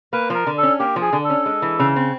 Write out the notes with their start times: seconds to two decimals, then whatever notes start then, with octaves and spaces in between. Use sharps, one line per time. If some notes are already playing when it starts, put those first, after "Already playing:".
0.13 A#3 B4
0.30 F3 A#4
0.47 D3
0.58 A4
0.63 C#4
0.79 A#3 G4
0.96 F3
1.01 G#4
1.13 D3
1.24 A4
1.30 C#4
1.46 G#3
1.62 E3
1.79 C#3
1.96 C4